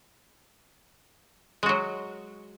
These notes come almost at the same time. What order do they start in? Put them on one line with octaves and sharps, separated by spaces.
G#3 F#4 F#3